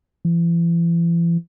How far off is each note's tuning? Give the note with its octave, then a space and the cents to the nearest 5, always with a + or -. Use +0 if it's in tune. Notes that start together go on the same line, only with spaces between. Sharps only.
E3 +40